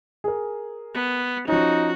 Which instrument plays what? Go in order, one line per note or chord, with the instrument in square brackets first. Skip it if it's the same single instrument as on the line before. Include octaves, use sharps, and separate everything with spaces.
[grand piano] G#4 A#4
[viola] B3
[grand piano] F3 C#4 [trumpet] D#4 [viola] F#4